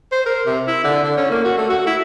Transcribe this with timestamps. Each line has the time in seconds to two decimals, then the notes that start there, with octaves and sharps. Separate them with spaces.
0.12 C5
0.26 A#4
0.46 C3
0.68 E4
0.84 D3
1.03 D3
1.17 C#4
1.30 A#3
1.45 F#4
1.57 A3
1.70 F#4
1.87 E4